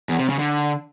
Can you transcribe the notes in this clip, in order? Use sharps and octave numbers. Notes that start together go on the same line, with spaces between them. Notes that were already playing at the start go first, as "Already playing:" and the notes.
E2
C3
C#3
D3